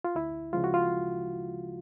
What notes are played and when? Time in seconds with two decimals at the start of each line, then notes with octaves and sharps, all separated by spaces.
0.04 F4
0.15 D2 E4
0.53 C#3 F3 G#3 F4
0.64 F#4
0.74 F4